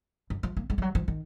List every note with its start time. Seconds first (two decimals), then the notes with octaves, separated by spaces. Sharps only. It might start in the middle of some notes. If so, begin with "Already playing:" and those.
0.30 F#2
0.43 F3
0.57 A#3
0.70 G#3
0.78 F3
0.82 F#3
0.95 F3
1.08 D#3